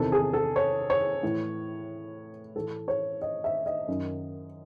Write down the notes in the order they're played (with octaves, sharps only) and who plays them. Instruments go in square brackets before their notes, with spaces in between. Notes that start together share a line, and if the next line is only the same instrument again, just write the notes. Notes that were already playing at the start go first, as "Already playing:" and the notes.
Already playing: [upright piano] E2 C3 D#3 A4
G#4
A4
C#5
C#5
A2 E3
A2 E3 A4
C#5
D#5
E5
D#5
F#2 D#3